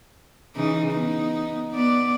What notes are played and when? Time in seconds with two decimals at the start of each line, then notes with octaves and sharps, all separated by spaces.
0.56 C#3 E3 D#4
0.91 B3 D#4
1.72 B3 D5